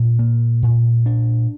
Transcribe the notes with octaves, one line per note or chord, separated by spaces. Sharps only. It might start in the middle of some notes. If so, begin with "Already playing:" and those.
Already playing: A#2 D4
A#3
A#2
D4